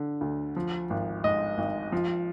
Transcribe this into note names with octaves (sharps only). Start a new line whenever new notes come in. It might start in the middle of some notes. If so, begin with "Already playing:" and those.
Already playing: D3
D2
F3
G#1
G#2 D#5
G#1
F3